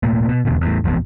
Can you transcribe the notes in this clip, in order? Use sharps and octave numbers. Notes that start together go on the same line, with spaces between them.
D#1 A#2 A3 A#3
B2
D#1 E2 B2 D3
E2 A2
E1 A1 F2 B2